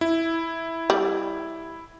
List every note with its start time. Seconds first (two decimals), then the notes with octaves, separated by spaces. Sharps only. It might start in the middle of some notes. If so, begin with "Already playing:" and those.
0.01 E4
0.90 G3